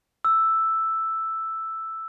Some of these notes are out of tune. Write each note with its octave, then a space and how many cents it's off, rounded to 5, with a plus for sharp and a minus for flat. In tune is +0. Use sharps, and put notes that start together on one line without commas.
E6 +5